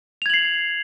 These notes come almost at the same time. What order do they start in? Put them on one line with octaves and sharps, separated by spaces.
F7 G#6 F#7 C7